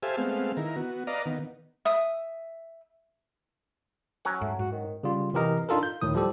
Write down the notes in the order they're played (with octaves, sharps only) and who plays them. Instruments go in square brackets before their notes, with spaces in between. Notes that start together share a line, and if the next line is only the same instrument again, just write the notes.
[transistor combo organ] G4 A4 C5 E5 F5 G#5
G#3 A3 B3 C4 F5
D#3 E4 A#4
B3 F#4
B4 D5 D#5 F5 A#5
D#3 B3
[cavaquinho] E5 D#6
[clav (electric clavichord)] F#3 C#4 F#5
[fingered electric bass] G#2 [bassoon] A3
[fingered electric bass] G#2 [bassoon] F#4
[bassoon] D#3
[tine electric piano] C#3 G3 F4
C3 E3 G4 A#4 D#5
D4 D#4 F4 A4 A#4
G6
D2 A2 D#3 D#6
F3 G3 G4 A4